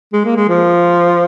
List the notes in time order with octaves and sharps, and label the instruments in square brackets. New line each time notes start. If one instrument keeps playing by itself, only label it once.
[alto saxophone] G#3
A#3
G#3
F3